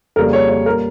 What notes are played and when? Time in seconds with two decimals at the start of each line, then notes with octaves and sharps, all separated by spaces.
0.16 F2 C#3 G3 A#3 A#4
0.33 C#5
0.50 C#5
0.66 A#2 G3 A#3 A#4